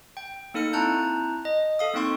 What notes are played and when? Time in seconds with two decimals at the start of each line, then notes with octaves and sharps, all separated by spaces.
0.17 G5
0.54 A#3 D#4 A4 F6 C#7
0.73 C4 E4 A5 A#5 F#6 G6
1.45 D#5
1.79 A4 F5 D#6
1.94 A#3 C4 D#4 G5 C6 C#6